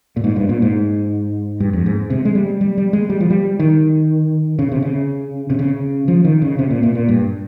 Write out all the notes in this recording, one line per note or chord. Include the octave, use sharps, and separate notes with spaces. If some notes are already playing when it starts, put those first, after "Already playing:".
A#2
G#2
G2
A#2
G#2
G2
F2
G#2
C3
G#3
G3
G3
G3
G#3
G3
F3
G3
D#3
C#3
C3
C#3
C3
C#3
F3
D#3
C#3
C3
A#2
A#2
A#2
G2